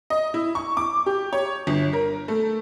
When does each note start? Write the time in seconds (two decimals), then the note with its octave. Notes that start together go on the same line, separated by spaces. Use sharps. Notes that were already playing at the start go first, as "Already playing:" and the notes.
0.10 D#5
0.34 E4
0.55 C#6
0.77 D6
1.06 G4
1.33 C#5
1.67 G1
1.93 A#4
2.28 A3